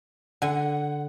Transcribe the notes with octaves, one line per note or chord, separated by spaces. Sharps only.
D3 F#5 G#5